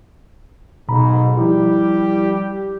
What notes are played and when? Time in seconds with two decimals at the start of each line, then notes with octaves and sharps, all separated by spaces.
0.89 B1 G#2 B2 A#5 B5
1.37 F3 G3 E4 G4